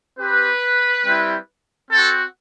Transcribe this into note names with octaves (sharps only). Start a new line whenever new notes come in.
C4 G4 B4
G3 C4 E4 G4
C4 F#4 A4